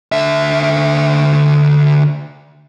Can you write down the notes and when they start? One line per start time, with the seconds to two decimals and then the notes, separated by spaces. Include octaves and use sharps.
0.12 D3 E5